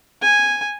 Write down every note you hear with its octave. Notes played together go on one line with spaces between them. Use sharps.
G#5